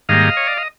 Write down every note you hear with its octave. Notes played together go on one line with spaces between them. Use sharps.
G#2 D#3 G3 A#3 D#5 F5
C#5
D5
D#5